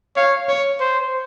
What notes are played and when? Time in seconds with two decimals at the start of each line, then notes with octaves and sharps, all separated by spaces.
0.16 C#5 F5
0.49 C#5
0.80 C5